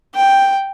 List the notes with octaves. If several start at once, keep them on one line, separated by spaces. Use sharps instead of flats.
G5